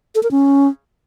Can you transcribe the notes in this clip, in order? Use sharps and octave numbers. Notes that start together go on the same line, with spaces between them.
A4
A#4
C#4